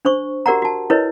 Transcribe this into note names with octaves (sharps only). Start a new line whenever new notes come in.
D4 C5 C#6
F#4 G4 A#4 D5 F#5 A#5
F#4 A5
E4 A#4 B4 C#5 D#5